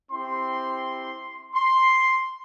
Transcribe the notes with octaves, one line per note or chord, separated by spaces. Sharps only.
C4 E4 G4 C6
C6